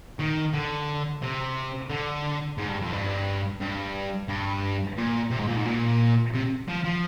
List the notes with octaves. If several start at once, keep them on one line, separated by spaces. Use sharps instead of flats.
D#3
D3
C3
D3
G#2
G2
F2
G2
G2
G2
A#2
C3
G#2
A#2
G#2
A#2
C3
F3
F3